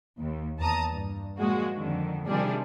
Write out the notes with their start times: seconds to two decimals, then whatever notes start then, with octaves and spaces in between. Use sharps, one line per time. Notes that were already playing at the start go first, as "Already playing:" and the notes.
0.19 D#2
0.59 E2 A5 A#5 D#6
0.91 G2
1.38 A#2 F3 G#3 F#4
1.77 F2 D3 D#3
2.27 C3 D#3 F3 G3 D4 G#4